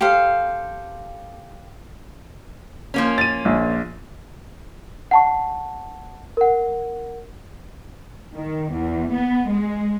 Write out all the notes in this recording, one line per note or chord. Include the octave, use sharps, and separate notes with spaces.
G4 A4 C5 F5
F3 A#3 C#4
A6 D#7
A#1
F#5 A5 C#6
A#4 F#5
D#3
E2
B3
G#3